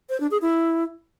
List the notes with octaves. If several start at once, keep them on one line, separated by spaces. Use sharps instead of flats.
C5
D4
G#4
E4